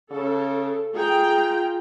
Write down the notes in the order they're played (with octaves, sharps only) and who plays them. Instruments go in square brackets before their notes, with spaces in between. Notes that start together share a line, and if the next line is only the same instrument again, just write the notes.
[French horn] C#3 [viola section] A4
[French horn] F4 [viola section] G#4 G5 A#5